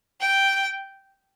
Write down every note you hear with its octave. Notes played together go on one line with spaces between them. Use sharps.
G5